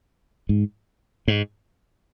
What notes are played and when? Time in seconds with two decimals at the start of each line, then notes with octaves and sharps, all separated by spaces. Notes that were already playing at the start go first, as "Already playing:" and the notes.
0.49 G#2
1.28 G#2